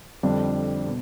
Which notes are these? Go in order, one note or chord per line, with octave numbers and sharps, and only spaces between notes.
F2 D3 G3 D4
B2